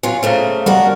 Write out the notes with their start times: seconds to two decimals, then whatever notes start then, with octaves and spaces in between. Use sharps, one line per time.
0.03 F#3 F4 G#5
0.23 C#3 A3 A#3 C5 C#5 F5
0.66 F3 G3 F#4 A#4 F#5